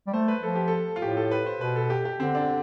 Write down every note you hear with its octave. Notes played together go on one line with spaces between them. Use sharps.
G3
A3 C5
B4
F3 A4
G4
A4
F4
A2 G4
A4
B4
C5
B2 B4
A4
G4
G4
D3 C4
D4